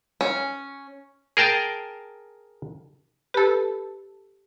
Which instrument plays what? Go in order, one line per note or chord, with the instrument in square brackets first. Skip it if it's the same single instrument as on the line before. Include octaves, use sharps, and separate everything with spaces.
[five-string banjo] C#4
[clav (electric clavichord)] G#4 A#4 G5 A5
[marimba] G4 [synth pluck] A4 B4